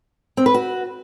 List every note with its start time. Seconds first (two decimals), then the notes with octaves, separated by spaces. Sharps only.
0.37 C4
0.46 B4
0.54 F#4